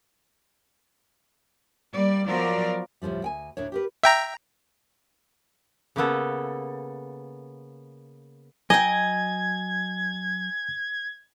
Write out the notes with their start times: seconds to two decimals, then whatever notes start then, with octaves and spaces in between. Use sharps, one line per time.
1.93 G3 A#3 D5
2.28 F3 F#3 B3 A#4 D5 F5
3.02 D2 A2 C3 F3 G3
3.22 D2 G5 G#5
3.57 D2 A2 D4 C#5
3.72 G4 A#4 B4
4.03 E5 G5 A#5
5.96 C#3 A#3 B3 A4
8.70 F#3 D#5 G5 G#5 G#6